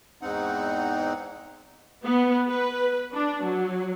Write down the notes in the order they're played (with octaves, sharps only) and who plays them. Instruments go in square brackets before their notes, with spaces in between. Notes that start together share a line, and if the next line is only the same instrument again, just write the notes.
[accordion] E2 G#2 C4 D#4 F#5
[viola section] B3
B4
D4
F#3